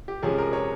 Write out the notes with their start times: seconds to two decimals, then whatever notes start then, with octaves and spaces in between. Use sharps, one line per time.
0.08 G4
0.23 C3 F3 G#3 C#4 G#4
0.38 A#4
0.53 C#5